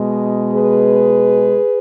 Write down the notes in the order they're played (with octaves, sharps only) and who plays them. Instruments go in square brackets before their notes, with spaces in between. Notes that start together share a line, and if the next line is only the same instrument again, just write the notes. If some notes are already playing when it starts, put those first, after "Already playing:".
Already playing: [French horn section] B2 G#3
G#4 B4